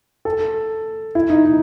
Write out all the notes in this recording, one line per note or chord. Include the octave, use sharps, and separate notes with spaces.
A4
E4
D#4
D#4